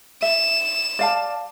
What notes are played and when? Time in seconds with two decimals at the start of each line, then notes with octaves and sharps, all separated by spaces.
0.22 E5 E7
0.99 D5 F5 A5